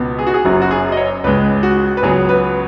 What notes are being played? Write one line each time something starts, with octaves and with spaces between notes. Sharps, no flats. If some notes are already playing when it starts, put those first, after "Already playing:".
Already playing: C#2 B2 B3
G#4
F#4
G#4
F#1 F#2 F#3 F#4
F#4
G#4
D#5
C#5
C#2 C#3 G#3 B4
F#4
B4
C#2 C#3 F#3 B3 G#4
B4